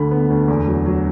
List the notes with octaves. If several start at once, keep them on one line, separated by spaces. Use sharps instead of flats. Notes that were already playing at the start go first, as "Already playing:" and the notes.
Already playing: D2 D3 B5
B3
D2
E2
F#3
F#3